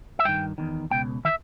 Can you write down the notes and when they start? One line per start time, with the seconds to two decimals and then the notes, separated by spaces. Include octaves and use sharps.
0.19 E5
0.25 G2 D#3 G5
0.58 E2 D#3
0.91 C#2 B2 G5
1.25 D#3 E5